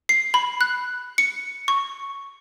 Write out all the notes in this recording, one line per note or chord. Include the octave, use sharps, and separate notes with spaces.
C7
B5
F#6
C#7
C#6